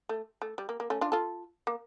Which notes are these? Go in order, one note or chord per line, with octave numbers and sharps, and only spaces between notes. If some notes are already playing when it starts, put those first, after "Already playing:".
A3
A3
G3
A#3
A#3
A3 C#4
D4 F4
F4 A4
A#3